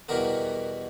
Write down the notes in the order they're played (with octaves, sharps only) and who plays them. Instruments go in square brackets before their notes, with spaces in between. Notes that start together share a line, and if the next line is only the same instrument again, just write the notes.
[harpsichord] E2 B2 G3 B3 A#4